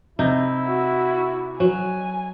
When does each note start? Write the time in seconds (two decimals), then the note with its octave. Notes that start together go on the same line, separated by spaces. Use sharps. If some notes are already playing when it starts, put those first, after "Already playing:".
0.19 C3 D#4 E4 G6
0.67 F#4
1.60 F#3 G#5